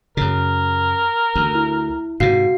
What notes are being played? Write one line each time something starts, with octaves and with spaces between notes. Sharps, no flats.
F#2 C#3 A#4
D2
E4
G#2 C3 F#4 F5 C7